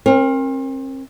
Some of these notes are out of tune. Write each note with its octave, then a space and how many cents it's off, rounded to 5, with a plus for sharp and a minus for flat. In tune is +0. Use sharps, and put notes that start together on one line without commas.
C4 +40 A#4 +0